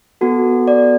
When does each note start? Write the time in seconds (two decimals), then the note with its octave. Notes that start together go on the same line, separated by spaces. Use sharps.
0.21 B3 F#4 A4
0.68 D5